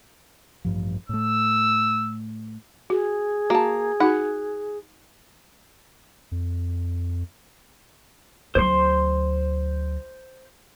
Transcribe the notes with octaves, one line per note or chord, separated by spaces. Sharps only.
A1 G2 F3
A2 A3 E6
F#4 G#4
A#3 F#4 A5
D#4 F#4 F#5
F2
D2 F#3 C5 C6